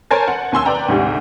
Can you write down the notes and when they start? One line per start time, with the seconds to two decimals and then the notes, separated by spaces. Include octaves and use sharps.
0.11 A#4 C5 C#5 G#5 A5 A6
0.28 F#5
0.52 D#2 G#5 C6 E6
0.65 B4 D5 G5 A#5
0.88 D2 G#2 C3